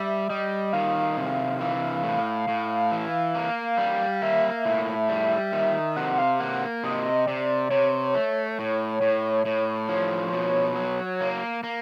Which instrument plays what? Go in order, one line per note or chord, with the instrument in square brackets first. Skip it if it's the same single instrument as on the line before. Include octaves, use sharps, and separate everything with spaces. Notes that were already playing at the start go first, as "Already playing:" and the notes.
Already playing: [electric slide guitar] G3 [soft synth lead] E5
[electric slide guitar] G3 [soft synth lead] D#5
[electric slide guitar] D#3 [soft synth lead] F5
[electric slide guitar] C3
E3
A2
A2
E3
A#3
G3
[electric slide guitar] A#3 [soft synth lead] E5
[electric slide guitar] A2
G3
D#3
[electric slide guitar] C3 [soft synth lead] F#5
[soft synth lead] F5
[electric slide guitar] A#3 [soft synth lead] F#5
[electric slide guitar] C3 [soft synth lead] D#5
[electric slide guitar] C3 [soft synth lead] D5
[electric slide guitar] C3 [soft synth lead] C#5
[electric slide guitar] A3
A2
A2
[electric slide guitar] A2 [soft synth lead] C#5
[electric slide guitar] F3
B2
F#3
A#3
A#3